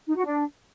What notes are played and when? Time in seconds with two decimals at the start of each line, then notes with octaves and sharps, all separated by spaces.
0.08 D#4
0.16 F#4
0.25 D4